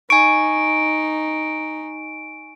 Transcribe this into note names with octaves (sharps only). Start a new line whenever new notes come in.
D#4 G#5 C#6 D7